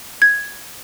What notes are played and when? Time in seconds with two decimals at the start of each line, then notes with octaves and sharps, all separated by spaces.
0.22 G#6